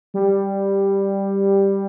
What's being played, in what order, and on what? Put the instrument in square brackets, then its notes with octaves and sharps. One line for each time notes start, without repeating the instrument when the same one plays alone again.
[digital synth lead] G3